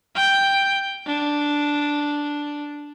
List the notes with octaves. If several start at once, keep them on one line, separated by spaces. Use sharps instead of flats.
G5
D4